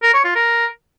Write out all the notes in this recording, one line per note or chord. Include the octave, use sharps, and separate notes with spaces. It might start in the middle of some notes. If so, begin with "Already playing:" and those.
A#4
C#5
F4
A#4